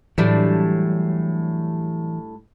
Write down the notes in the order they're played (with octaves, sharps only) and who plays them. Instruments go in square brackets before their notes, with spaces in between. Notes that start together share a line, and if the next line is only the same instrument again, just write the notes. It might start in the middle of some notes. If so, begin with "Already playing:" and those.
[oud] A2 G3 D4 [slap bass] E3 F#3